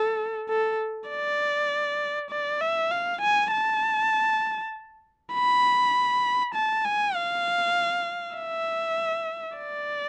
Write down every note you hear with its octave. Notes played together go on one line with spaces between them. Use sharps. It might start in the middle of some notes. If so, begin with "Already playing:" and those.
Already playing: A4
A4
D5
D5
E5
F5
G#5
A5
B5
A5
G#5
F5
E5
D5